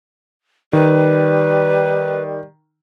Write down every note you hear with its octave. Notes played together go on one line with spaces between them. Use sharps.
D#3 G3 B4